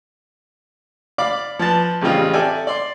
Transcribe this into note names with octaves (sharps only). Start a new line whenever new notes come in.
D5 F5 B5 D6
F3 B4 A5
A1 C#3 G3 C4 F4 D#5
A4 D5 E5 G5 G#5
D5 C6